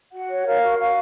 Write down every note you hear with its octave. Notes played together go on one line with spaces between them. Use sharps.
F#4 F#5
C#5
A#4 F5
F#4
F#4 F5